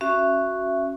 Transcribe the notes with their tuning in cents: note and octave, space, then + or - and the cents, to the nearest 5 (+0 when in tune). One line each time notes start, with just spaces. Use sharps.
C#4 -5 F#4 +0 E5 +20